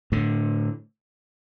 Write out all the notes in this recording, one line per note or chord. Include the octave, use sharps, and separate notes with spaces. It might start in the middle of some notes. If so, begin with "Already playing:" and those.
A2 D3